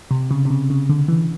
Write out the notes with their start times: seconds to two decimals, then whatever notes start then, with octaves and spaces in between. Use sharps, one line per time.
0.11 C3
0.31 C#3
0.45 C3
0.50 C#3
0.70 C#3
0.89 D3
1.08 E3